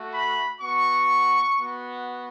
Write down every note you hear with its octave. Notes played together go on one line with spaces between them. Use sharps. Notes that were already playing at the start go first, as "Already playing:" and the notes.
Already playing: A3 F#4
B5
B3 F#4 C#6
B3 F#4